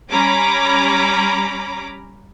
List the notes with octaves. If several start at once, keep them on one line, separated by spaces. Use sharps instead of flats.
G3 C#4 A#5 B5 D6